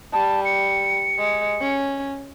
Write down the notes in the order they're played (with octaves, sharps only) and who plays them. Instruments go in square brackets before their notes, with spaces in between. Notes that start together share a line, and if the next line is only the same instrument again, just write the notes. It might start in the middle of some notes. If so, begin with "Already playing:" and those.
[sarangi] G3 [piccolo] A5
[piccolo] C#7
[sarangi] G#3
C#4